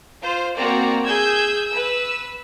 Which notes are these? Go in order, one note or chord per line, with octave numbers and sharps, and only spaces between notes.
F4 C5
A#3 C4 F#4 D5 A#5
G#4 E6 G6 G#6
B4 E6